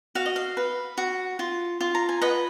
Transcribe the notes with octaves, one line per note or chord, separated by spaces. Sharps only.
F#4 F5
D#5
F5
B4
F#4
F4
F4
A#5
G#5
B4 D#5 F#5